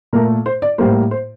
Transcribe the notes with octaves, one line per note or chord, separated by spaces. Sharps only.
A#2 A3 A#4
C5
D5
A2 G3 A#3 C5
C5